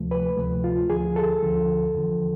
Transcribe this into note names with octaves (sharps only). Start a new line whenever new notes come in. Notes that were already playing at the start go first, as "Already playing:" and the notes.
Already playing: D2 C3 F3 A3
B4
D2 C3 F3 A3
F4
D2 D3 F3 G#4
A4
D2 D3 F3
E2 D3 F3